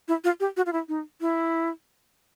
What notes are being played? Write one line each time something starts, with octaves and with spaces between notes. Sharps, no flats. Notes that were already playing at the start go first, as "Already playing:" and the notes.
E4
F4
G4
F#4
F4
E4
D#4
E4